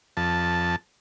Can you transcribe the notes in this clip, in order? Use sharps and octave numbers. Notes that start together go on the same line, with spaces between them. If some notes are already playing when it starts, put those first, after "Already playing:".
F2 A5